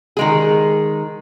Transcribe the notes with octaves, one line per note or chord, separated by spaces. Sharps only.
D#3 G#3 G#4